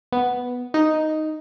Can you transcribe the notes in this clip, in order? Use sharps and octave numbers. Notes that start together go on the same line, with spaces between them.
B3
D#4